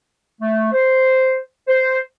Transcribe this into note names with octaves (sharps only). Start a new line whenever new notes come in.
A3
C5
C5